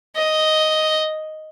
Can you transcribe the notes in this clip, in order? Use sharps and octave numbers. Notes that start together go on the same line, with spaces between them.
D#5